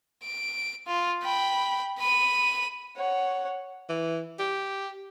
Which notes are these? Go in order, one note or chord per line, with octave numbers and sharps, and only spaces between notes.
D7
F4
G5 B5
B5 D#7
C#5 F#5
E3
G4